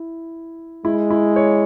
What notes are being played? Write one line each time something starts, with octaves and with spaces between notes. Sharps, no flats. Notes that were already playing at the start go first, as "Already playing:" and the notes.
Already playing: E4
G#3 E4
E4
C#5